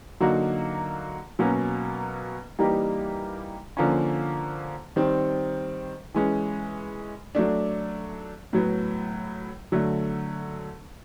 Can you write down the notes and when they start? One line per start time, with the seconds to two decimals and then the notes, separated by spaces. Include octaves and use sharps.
0.20 D3 F#3 A#3 D#4 F#4
1.39 B2 F#3 A#3 C#4
2.59 E3 G3 A#3 D#4 G4
3.77 D3 F3 A#3 C#4
4.96 D#3 G3 C4
6.14 E3 G#3 C#4
7.35 F#3 A3 D4
8.53 A2 F#3 B3
9.72 D3 F#3 A3